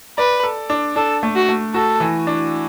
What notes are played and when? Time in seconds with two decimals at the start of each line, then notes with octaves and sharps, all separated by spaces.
0.18 B4 D5
0.43 A4
0.70 D4
0.96 D4 A4
1.23 A3
1.36 F#4
1.49 A3
1.74 F#4 A4
2.00 E3
2.27 D4